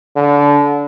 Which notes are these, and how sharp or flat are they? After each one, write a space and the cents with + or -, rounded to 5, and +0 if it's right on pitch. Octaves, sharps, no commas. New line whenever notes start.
D3 -25